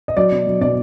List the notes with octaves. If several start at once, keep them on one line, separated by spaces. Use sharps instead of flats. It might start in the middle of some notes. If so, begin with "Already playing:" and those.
D#5
F#3 D5
B2
F#3
B2 D5